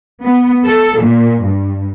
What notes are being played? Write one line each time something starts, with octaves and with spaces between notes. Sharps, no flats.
B3
A4
A#2
G2